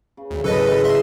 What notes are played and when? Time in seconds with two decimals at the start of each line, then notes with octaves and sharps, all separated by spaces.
0.17 C#3
0.31 D2
0.44 G#1 C#3 E3 F#3 A4 B4 D#5
0.63 G#3
0.84 D#5 E5 C6